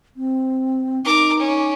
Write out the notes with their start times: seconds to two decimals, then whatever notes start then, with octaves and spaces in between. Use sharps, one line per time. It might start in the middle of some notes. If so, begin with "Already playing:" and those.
0.16 C4
1.05 D#4 A#4 D6
1.39 C#4